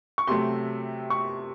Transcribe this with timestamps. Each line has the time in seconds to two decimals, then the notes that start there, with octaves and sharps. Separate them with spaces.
0.18 C#6
0.27 C3 F#3 A3 C6
1.10 C#6